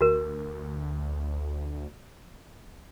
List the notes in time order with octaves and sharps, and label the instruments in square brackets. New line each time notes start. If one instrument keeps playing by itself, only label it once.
[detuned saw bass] D2 [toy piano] F#4 A#4